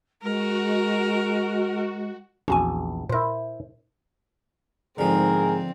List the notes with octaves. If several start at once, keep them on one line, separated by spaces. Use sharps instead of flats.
G#3 F#4 A#4
A#1 E2 C#4 F#4 G#5
A#2 E4 A#4 C5
G#2 D3 F3 C4 G#4 A#4